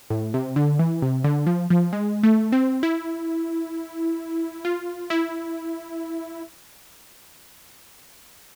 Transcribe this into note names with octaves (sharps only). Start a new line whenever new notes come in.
A2
C3
D3
E3
C3
D3
F3
F3
G#3
A3
C4
E4
F4
E4